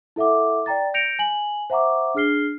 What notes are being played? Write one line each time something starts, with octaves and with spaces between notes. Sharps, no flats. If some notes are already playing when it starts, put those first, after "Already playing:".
E4 A4 E5 F#5 D6
D5 G5 A#5 A6
G6 A#6 C#7 D7 F7
G#5 F#7
C5 E5 F#5 A#5 C#6 D6
D4 G#4 F6 C7 G7